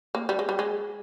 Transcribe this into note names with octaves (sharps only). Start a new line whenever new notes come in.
A#3
G3
G#3
G3
G#3